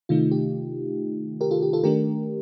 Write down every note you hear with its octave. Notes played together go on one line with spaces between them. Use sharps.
C3 D#3 A3 D#4 F4
G4
G4 A#4
F4 A4
G4
F4 A4
D#3 A3 D4 G4 A#4